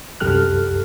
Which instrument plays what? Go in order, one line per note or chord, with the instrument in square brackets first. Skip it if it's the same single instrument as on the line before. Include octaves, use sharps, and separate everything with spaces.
[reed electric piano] C2 F#2 G4 A4 F6 F#6